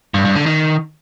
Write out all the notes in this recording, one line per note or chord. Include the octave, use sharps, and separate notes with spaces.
G2
G2
D3
D#3